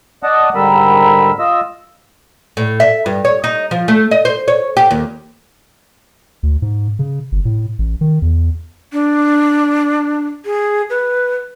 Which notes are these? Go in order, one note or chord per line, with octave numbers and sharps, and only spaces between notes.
D5 D#5 F#5 A5 D#6
G#2 D3 G3 A#4 B5 E6
F4 D#5 E6
A2
E5
G2
C#5
D#4
F3
A3
D#5
C5
C#5
G4
D#2
D2
G#2
C#3
G1
A2
A1
D#3
E2
D4
G#4
B4